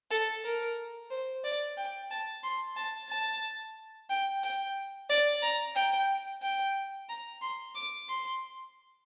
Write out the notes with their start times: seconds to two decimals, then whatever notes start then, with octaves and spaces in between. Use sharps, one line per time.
0.11 A4
0.45 A#4
1.10 C5
1.44 D5
1.77 G5
2.11 A5
2.43 C6
2.76 A5
3.09 A5
4.10 G5
4.43 G5
5.10 D5
5.43 A#5
5.76 G5
6.42 G5
7.09 A#5
7.42 C6
7.75 D6
8.09 C6